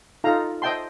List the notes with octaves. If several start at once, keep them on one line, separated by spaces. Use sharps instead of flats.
D#4 F4 A4 F5 A#5
C5 D#5 E5 G5 A5 C6